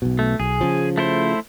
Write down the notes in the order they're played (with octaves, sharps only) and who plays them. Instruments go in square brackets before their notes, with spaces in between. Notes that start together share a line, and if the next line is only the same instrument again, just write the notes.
[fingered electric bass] B1 B2
[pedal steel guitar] A3
[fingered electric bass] B1 [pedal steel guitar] G#4
[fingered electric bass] C#3 F3
[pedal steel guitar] A3 E4 C5